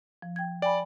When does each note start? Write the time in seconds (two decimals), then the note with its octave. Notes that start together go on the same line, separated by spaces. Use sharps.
0.22 F3
0.36 G5 G#6
0.62 D5 G5 G#5 B5